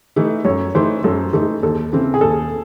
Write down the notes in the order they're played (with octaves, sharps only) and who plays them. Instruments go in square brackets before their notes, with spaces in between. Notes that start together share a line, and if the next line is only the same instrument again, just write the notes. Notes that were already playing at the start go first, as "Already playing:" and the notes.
[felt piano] E3 A3 D#4
[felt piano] F#2 [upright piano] C#5
[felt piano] E3 A3 D#4 [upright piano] C5
[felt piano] F#2 [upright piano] A4
[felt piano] E3 A3 D#4 [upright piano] A4
[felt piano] D#2 [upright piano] A4
[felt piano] C#3 E3 C4
[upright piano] G#4
[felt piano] D#2 [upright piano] A4